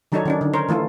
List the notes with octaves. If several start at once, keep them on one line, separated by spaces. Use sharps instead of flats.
D#3 F#3 D4 D#4 A4 C#5
D#3 C#4 D4
D3
A#4 C5 C#5
E3 A3 F4 A4